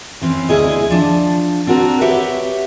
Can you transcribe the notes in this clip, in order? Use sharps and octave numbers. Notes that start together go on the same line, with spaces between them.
E3 C4 C#4
D2 E4 G#4 D#5
F3 D4
C4 D4 F#4 A#4
F#4 G4 B4 C#5 E5 F#5